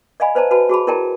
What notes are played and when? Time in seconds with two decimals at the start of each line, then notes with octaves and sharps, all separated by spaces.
0.20 D5 D#5 F5 G#5 B5
0.35 B4 C5 D5 A5 A#5
0.51 F#4 B4 A5 B5
0.69 F#4 G#4 A5 B5
0.87 E4 A#4 D5 G5 A5 A#5